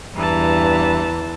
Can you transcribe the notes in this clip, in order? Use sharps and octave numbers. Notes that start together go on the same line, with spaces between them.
E2 G2 E3 B4 A5 A#5